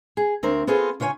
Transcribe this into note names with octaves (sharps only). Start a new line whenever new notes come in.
G#4
D2 C4 A#4
B3 C4 F4 G#4 A4
C#3 F4 C#5 F#5 G#5